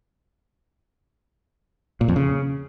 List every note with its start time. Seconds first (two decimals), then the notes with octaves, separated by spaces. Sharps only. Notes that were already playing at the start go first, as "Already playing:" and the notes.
2.01 A#2
2.08 F2
2.16 C#3